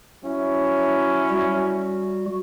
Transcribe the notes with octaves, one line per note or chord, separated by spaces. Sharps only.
F#3 C#4 E4
G3 F#4